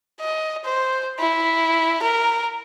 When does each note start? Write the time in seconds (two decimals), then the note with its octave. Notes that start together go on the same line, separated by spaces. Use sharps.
0.20 D#5
0.65 C5
1.19 E4
2.02 A#4